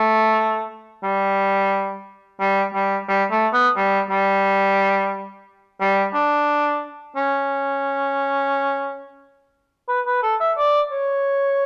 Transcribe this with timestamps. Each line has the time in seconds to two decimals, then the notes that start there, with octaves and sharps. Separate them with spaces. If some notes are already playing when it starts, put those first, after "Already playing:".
Already playing: A3
1.03 G3
2.40 G3
2.74 G3
3.08 G3
3.31 A3
3.53 B3
3.76 G3
4.10 G3
5.80 G3
6.14 D4
7.16 C#4
9.89 B4
10.06 B4
10.23 A4
10.40 E5
10.57 D5
10.91 C#5